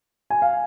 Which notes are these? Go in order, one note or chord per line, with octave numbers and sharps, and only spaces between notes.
G#5
F5